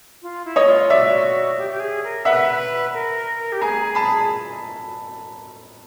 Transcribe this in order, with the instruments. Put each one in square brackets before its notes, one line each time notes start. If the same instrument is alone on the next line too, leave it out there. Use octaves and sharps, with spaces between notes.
[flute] F4
E4
[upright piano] C#5 D#5
[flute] F4
[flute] F#4 [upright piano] D5 E5
[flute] G4
G4
G#4
A#4
[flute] B4 [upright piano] E5 F#5
[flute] A#4
G4
[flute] G#4 [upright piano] G#5 A#5
[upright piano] A5 B5